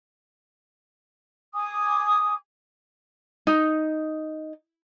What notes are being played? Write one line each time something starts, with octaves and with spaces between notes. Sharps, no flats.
G#5 D6 D#6
D#4